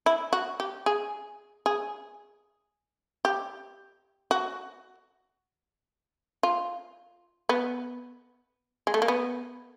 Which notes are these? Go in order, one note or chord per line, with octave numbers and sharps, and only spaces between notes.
E4
F#4
G4
G#4
G#4
G4
F#4
F4
B3
G#3
A3
A#3
B3